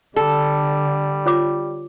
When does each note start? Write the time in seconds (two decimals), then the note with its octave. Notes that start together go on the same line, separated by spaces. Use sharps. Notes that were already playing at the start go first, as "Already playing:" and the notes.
0.16 D3 G3 A4
1.26 F4 C#5 D6